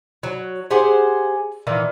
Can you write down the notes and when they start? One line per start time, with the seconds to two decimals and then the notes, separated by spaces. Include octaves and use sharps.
0.23 F#3
0.71 G4 G#4 C5 F#5
1.67 A#2 D#3 E3 A#3